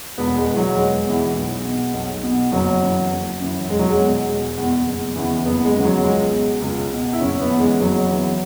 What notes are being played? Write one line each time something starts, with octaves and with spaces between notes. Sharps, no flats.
E1 B3
G#3
E2 E3
F#3
E1 G#3
E2 E3
B1
B2
B1
B2
F#1 F#3
F#2 E3
F#1
F#2 E3
E1 G#3
F#3
G#3
E2 B2
E1
E2 B2
F#1
E2 C#3 E3
F#1 B3
G#3
E2 C#3 E3
F#3
C#2 G#3
B2
C#2
B2
E4
F#1 C#4
B3
E2 E3
G#3
F#1 F#3
E2 E3